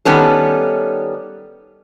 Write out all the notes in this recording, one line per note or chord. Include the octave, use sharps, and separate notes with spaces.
D#3 G3 B3 C#4 A4